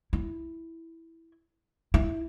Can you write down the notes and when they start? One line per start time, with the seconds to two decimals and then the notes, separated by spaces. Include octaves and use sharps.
0.13 E4
1.94 E4